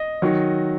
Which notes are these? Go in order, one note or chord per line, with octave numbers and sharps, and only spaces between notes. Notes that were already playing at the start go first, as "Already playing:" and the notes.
Already playing: D#5
D#3 F#3